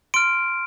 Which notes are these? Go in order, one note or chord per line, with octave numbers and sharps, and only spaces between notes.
C6 F6 D7